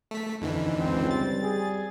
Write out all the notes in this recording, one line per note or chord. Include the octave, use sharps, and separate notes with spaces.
A3 B6
F2 D3 E3 D#4
C#2 C4
G3 A6
G#4